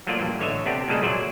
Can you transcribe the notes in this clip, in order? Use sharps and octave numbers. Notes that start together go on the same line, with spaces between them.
F3 F#3 A3 A#3 F4 D5
G2 A#2 E3
A1 D3 C#5 D#5 E5
C3 B3 C4 D4 G4
A#2 C#3 G3 G#3 G#4 A4
A#2 F#3 C5 D5 E5